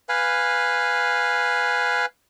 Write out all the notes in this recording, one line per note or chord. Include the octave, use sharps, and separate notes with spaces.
B4 F5 G#5